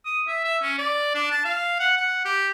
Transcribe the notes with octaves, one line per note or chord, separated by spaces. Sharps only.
D#6
E5
E5
C#4
D5
D4
A5
F5
F#5
F#5
G4